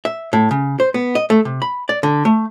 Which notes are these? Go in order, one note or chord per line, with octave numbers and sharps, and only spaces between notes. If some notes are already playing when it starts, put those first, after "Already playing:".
E5
A2
C#3
C5
B3
D#5
A3
C3
B5
D5
D3
A3